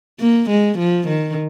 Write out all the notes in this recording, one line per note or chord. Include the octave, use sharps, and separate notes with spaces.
A#3
G#3
F3
D#3